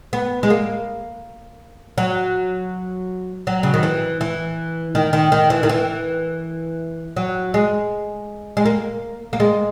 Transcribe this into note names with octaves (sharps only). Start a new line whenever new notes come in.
B3
G#3
A#3
F#3
F#3
C#3
D#3
E3
E3
D#3
D#3
D#3
E3
D#3
E3
F#3
G#3
G#3
A#3
A#3
G#3